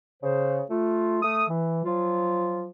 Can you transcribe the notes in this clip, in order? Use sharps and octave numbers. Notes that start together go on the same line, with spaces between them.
C#3 C5
A3 F4
A3 D#6
E3
F3 F#3 F4